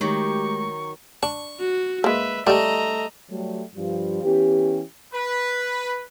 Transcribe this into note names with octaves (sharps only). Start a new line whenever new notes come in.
D#3 F#3 G#3 A3 G4 C#6
D4 C#6
F#4
G#3 A#3 B4 E5
G3 A3 G4 D#5 A#5
F#3 G3 A3
G2 F3 G3
E3 B3 C#4 G4
B4